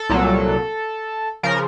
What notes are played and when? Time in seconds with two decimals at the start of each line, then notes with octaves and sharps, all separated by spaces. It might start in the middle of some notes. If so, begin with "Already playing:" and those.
Already playing: A4
0.10 C2 A#2 F#3
1.43 C#3 F3 A#4